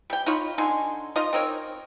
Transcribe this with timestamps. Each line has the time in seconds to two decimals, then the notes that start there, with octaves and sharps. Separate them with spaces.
0.10 G3 G5
0.26 D#4 F4 C#5 B5
0.58 D3 D#4 G#5 C6
1.16 D#4 F4 D#5
1.33 C4 D#4 A#4 C#5